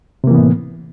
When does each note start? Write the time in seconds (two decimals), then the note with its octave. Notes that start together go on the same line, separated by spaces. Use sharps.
0.24 C3
0.27 A#3
0.31 E3
0.34 B3
0.38 A2